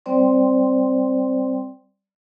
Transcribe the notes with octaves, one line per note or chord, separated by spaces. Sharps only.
G3 C4 C5 D5 G5 C6